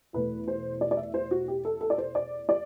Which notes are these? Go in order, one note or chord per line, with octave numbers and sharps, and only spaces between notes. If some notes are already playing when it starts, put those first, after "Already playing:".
E2 B2 A3 B4
C5
D5
D5
E5
C5
F#4
G4
A4
A4
D5
C5
D5
D5